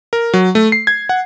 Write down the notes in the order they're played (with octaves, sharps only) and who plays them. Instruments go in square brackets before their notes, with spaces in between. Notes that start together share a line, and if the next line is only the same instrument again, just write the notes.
[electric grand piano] A#4
F#3
A3
C7
G#6
F#5